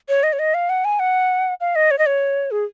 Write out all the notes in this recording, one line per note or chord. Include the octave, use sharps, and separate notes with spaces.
C#5
D#5
C#5
D#5
F5
F#5
G#5
F#5
F5
D#5
C#5
D#5
C#5
G#4